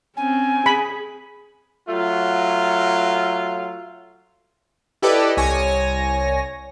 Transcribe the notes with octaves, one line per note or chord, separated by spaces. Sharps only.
C4 C#4 G#5
G#4 B5
F#3 A3 F4
E4 G4 A4 B4 D5 D#5
C2 C#5 G#5 A#6